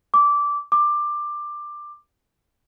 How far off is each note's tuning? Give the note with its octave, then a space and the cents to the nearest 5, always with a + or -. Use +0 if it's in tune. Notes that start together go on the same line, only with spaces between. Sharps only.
D6 -15
D6 +15